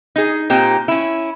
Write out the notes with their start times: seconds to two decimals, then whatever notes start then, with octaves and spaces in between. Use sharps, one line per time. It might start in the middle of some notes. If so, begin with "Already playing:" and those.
0.16 D#4 G#4
0.50 A#2 C4 D#4 G4
0.88 C#4 E4